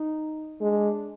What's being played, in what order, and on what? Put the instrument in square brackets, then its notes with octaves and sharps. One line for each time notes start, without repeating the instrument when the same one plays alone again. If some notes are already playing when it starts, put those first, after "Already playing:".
Already playing: [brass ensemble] D#4
[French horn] G#3 [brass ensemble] D4